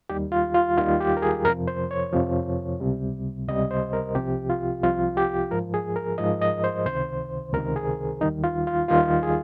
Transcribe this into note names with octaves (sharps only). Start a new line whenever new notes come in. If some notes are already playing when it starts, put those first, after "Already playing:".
D#2 D#3 G3 G4
F4
F4
D#2 D#3 G3 F4
G4
A#4
G#4
F2 C3 F3 A#4
C5
C#5
F2 C3 F3
C#2 C3 G3
C#2 C3 G3 D#5
C5
A#4
C2 C3 F3 G4
F4
C2 C3 F3 F4
G4
G#2 F3 A#4
G#4
A#4
G#2 F3 D#5
D#5
C5
C#2 C3 D#3 C5
C#2 C3 D#3 A#4
G#4
D#2 D#3 G3 D#4
F4
F4
D#2 D#3 G3 F4
G#4